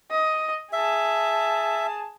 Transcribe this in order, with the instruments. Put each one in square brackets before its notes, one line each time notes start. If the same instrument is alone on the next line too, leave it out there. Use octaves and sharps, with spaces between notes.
[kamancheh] D#5
[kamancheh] G#4 A5 [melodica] E5